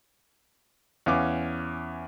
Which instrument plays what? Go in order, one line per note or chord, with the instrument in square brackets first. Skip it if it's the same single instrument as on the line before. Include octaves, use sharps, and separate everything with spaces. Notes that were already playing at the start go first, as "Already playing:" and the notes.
[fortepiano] E2 C#4 F5 D6